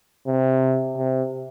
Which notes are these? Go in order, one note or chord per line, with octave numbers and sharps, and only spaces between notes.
C3
C3